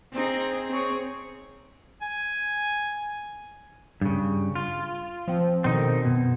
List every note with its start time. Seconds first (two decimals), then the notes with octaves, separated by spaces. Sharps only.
0.13 C4 D#4 G#4
0.69 C4 G#4 C#5
2.02 G#5
4.01 G2 C#3
4.55 F4
5.28 F3 C4
5.64 B2 D3 D#3 C4 D#4
6.05 F#2 B2